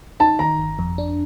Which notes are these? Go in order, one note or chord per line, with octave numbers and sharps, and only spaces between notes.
D#4 A5
D#3 A#5
G1
F2
D4